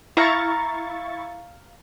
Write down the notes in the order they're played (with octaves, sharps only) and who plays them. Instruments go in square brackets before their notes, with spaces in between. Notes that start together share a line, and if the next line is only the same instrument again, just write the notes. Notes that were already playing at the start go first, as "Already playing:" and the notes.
[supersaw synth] E4 C#6 A6 [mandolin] F5 A#5